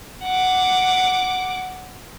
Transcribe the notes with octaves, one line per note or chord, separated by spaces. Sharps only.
F#5 D6